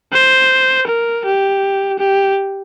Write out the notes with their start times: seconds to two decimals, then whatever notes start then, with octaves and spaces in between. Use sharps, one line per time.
0.13 C5
0.87 A#4
1.25 G4
1.99 G4